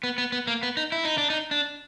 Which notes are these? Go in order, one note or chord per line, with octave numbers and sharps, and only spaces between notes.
B3
B3
B3
A#3
B3
D#4
E4
D#4
D4
D#4
D4